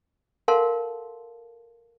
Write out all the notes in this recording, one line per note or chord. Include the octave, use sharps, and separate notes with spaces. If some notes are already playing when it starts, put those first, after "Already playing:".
A4 A#4 F5 F#5 A5 C6